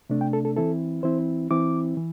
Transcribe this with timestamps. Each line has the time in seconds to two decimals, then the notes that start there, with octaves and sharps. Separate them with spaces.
0.10 C3 A3 D4
0.21 G5
0.33 A4
0.45 A4
0.57 E3 C4 E4 A4
1.03 E3 C4 E4 C5
1.51 E3 C4 E4 D6
1.97 E3